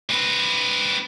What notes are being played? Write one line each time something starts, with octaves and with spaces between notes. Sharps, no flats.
C4 B4